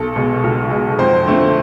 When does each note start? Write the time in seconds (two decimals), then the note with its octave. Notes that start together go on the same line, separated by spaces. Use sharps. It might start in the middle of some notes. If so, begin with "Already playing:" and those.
Already playing: B1 A4
0.16 B2 G#3
0.44 B1
0.71 B2 G#3
0.98 F2 C5
1.26 D3 A3 C4